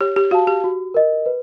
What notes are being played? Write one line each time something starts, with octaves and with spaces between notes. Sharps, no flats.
G4 C#5
G4
F#4 F5 A5
G4
F#4
A#4 D#5
B4